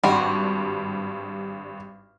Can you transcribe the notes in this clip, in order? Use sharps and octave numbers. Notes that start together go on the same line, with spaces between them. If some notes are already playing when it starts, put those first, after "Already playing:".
G#1 G2 G3 F#4 C6